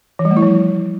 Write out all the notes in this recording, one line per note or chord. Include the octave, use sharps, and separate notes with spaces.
E3
G3
A3
E4
F3